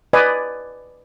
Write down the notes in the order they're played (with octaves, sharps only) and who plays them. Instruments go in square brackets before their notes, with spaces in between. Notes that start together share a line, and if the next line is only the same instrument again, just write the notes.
[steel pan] B4 D5 D#5 G#5